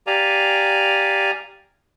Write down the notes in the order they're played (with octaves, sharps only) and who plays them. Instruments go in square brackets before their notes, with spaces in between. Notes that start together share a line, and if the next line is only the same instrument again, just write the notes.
[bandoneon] G4 D5 F5 G#5 A#5